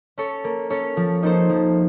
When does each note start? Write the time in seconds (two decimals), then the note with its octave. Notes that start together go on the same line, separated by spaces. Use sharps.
0.18 C#4 A4 C#5
0.44 A#3
0.70 C#4 A4 C#5
0.97 F3
1.23 A#3 D#4 A4 C5
1.49 F3